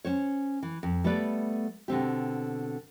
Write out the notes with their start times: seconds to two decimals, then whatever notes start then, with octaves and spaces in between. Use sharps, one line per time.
0.05 C#4 C5 C#5
0.63 E3
0.83 F2
1.04 G3 A3 B3 B4 D5
1.88 B2 D3 C4 G4